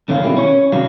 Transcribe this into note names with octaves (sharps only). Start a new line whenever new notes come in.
F#2 D3 D#3 C#4 F5
B2 D#3 G3 E4
C#4 C#5
C2 D#3 F#3 D4 F5